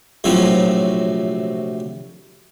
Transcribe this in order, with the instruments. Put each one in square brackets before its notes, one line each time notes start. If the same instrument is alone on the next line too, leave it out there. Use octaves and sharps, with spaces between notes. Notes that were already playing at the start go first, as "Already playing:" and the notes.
[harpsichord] A#1 A2 C3 F3 F#3